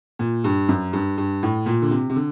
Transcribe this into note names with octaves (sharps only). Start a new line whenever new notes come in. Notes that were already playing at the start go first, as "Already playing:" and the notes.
A#2
G2
F#2
G2
G2
A2
A#2
D3
C3
C3
D3